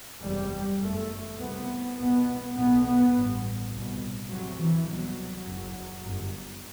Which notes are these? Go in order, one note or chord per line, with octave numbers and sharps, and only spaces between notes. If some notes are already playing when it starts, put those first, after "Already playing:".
F#1 E2 C3 G3
G1 F#2 A3
C2 C3 B3
C2 B2 B3
B1 B2 B3
B3
A1 G2
C2 B2
D2 C3 F#3
E3
C2 B2 F#3
F#1 F#2
G1 F#2